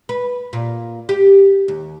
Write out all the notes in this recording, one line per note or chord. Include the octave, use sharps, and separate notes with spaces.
B4
A#2
G4
D#2